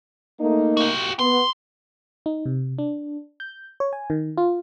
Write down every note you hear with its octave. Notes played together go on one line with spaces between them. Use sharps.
A3 A#3 D#4
F#4 G4
B3 C6
D#4
C3
D4
G6
C#5
G#5
D#3
F4